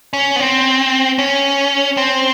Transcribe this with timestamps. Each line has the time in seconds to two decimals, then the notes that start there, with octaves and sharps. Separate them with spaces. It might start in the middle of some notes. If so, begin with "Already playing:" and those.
0.13 C#4
0.36 B3
0.40 C4
1.19 C#4
1.97 C4